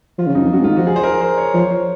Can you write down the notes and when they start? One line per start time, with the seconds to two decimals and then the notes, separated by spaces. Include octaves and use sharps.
0.18 F3 F4
0.27 C#3
0.35 F#2 D#4
0.44 F2
0.53 F#2 F#4
0.62 G#2 F4
0.69 D#3
0.77 F3 F#4
0.87 G#4
0.96 C5
1.03 A#4
1.21 C5
1.37 C#5
1.54 F3 C#5
1.71 C5